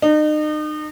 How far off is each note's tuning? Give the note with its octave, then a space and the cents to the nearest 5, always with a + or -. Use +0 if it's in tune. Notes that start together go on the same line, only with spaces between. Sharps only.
D#4 -35